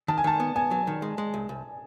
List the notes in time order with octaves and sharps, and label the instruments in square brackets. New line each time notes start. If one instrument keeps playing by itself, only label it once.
[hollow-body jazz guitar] D#3 [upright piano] A5
[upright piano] G#5
[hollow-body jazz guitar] D#3 [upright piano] A5
[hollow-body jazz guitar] B3
[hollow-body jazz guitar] B3 [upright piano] G#5
[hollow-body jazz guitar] F#3
D#3
G#3
G#3
C2
C2